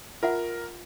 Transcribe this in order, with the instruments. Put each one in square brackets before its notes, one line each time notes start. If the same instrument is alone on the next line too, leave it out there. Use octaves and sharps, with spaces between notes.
[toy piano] F4 E5 F#5 [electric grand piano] A#4